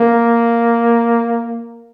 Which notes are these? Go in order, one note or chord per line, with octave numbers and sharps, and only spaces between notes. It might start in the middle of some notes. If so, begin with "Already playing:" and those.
Already playing: A#3